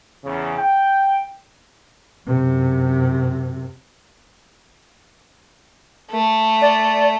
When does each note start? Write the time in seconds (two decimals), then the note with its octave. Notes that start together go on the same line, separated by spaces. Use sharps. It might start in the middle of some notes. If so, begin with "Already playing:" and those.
0.24 E2 C#3
0.58 G5
2.27 F#2 C3
6.11 A3
6.62 D5